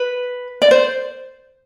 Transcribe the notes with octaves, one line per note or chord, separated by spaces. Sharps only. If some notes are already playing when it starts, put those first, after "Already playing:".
Already playing: B4
D5
C5